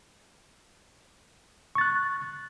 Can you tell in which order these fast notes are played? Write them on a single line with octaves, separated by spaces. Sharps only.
C#6 A6 F#6